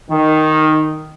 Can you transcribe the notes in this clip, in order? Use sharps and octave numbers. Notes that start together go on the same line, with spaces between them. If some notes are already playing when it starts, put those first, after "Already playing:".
D#3